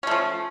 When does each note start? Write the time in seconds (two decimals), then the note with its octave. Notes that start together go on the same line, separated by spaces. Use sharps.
0.03 C#4
0.07 A3
0.11 F3